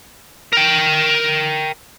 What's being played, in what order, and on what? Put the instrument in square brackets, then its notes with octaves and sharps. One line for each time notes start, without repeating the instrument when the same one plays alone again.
[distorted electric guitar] A#4 G5